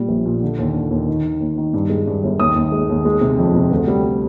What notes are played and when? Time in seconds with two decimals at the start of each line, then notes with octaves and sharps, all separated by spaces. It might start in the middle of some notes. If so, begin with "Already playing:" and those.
Already playing: A#2 G3
0.09 A#1
0.26 A#2
0.43 D3
0.59 D#2
0.74 D3
0.91 D#2
1.08 D#3
1.25 D#3
1.40 D#2
1.58 D#3
1.74 G2
1.89 G#3
2.07 G2
2.24 G1
2.39 D#2 D#6
2.56 D#2
2.72 G#3
2.89 D#2
3.05 G#3
3.21 C3
3.39 F2
3.55 C3
3.71 D2
3.88 G3
4.04 G3